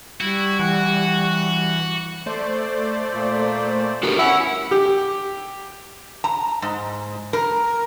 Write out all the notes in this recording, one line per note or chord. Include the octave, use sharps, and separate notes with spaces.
G3 E4 F#4
E3 F#5
A3 C5 D5
A#2
F#4 G4 A#4
C#4 E4 F#5
G4
A#5
G#2
A#4